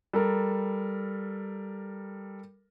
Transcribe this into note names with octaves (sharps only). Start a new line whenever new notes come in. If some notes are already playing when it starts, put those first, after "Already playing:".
G3 A4 A#4